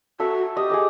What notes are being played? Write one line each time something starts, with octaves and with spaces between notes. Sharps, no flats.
F#4 A4 E5
G4 D#5
G#4 D#5 D6